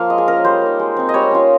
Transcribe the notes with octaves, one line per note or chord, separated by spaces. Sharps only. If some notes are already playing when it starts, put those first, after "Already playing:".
Already playing: F3 A#3 F4 F5
G#3 D#5
G#4
C#4 F4 A#4
G3 C5
A#3 D#4
G#3
C4 D#4
D#5
G3 C#5
C#4 F4